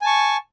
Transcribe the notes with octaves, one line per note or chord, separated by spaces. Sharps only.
G#5 A5 C#6